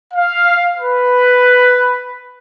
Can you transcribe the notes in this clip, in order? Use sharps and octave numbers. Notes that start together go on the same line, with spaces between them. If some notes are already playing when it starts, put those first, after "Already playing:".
F5
B4